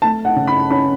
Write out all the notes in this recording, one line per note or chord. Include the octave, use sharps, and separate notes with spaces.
A3 A5
F#5
C#3
B5
C#4 B5